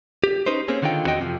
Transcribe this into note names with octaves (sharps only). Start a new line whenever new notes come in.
G4
C#4 D#4 B4 C5
A#3 C4 C#4 G#4
D3 D#3 D#4 F4 G5
E2 C4 F#4 D#5 G5
F2 C3 F3